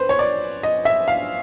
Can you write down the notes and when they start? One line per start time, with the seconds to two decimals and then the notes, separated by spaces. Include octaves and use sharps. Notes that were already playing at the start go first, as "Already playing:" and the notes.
Already playing: B4 C5
0.09 C#5
0.19 D5
0.63 D#5
0.85 E5
1.08 F5